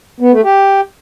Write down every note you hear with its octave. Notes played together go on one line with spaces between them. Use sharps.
B3
A3
G4